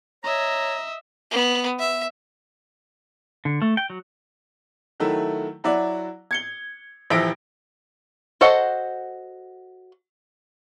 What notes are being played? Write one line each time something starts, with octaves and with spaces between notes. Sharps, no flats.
C#5 D#5 E5 A#5
B3
E5
D3
A3
G5
F#3
D#3 F#3 A3 E4
F#3 E4 F#4 D5
G#6 C#7 G7
D#1 E3 F3 E5 A#6 D7
F#4 A4 C5 D#5 F#5